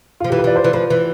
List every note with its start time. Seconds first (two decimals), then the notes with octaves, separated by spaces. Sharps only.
0.20 F3 F4
0.30 E3 G4
0.38 B4
0.44 E3 D5
0.56 C5
0.64 E3
0.73 F3 B4
0.90 E3